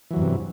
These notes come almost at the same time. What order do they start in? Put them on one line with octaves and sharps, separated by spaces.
E3 F#3 E2 G2 C3